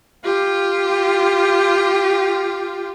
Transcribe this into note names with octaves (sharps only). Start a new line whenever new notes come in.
F4 G4